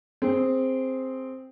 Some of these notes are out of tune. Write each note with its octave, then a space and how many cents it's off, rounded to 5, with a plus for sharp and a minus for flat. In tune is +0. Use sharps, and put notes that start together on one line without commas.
C4 +0 G#4 +0